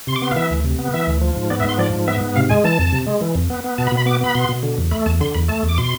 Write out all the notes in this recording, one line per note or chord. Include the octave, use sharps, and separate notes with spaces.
C3 C6
D6
B3 C6
F5
E3 E5
D2
C3
B3
E3 E5
D2
F3
G#2
B3 D5
E5
G#2 C6
F3 D5
G#2
B3 E5
G#2
C3 F5
G#3 G#5
E3 A5
F2
C3
G#3
E3
F2
B3
B3
B2 A5
B5
B2
B5
B3 D6
B3 B5
B2 C6
B2
D3
E2
A3 B5
E2 A5
D3 C6
E2 B5
A3 A5
E2
D6
B2 C6